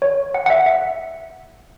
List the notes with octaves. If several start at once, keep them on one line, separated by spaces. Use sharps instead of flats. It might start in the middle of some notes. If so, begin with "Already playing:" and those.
C#5
F#5
F#5
E5
E5